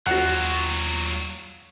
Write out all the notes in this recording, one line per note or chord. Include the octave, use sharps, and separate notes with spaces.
D#2 F#3 F4 F#4 F#5